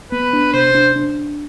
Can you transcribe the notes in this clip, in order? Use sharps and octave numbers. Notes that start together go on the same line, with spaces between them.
B3 B4
D4
C3 C5
D4
D4